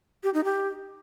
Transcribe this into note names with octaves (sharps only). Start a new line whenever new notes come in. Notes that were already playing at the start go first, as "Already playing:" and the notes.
G4
D#4
G4